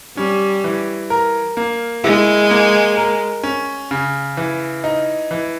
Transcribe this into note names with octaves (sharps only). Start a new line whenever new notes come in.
G3 C#4
E3
A#4
A#3
G#3 E4
A#3
A#4
C#4
C#3
E3
D#4
E3